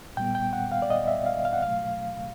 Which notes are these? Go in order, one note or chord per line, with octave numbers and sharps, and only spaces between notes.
A#2 G3 B3 G5
G5
F#5
F5
D5
D#5
E5
F5
F5
F#5
B2 F#3 A3 F5